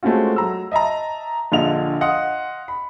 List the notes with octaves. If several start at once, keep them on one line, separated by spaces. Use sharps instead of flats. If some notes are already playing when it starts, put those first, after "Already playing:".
G#3 A3 C4 C#4 F4 F#4
F#3 A#5 E6
D#5 E5 A5 A#5
A#1 D3 F4 D#5 F7
D#5 F5 F#5 C6 D#6
B5